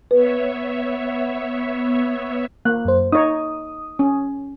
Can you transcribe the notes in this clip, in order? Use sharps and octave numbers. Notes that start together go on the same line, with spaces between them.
B3 B4 C#5 E5
A#3 F#6
F#2 C5
D#4 C#5 D#6
C#4